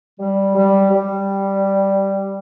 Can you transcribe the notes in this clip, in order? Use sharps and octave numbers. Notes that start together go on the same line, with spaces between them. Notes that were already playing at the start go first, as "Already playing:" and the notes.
G3
G3
G3